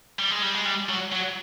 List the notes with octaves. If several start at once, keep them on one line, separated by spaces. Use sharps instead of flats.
G3
G#3
G3
G#3
G3
F#3
F#3